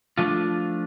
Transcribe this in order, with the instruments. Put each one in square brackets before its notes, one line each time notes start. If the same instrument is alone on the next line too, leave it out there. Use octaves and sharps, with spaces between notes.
[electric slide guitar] F3 A3 D4 F4